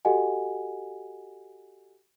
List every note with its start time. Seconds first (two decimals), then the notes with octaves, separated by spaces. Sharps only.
0.05 F#4 G4 A4 D#5 F#5 G#5